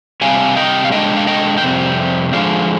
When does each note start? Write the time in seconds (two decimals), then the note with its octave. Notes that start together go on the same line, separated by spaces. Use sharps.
0.21 C3 G3 D4 F5 G#5
0.57 D#5 G5
0.85 F5
0.92 D3 G#3 D4 D#5 G5
1.17 F5
1.27 D#5 G5
1.58 G5
1.62 F2 C3 G3 C4
2.33 D3 F3 G#3 D4 D5 F5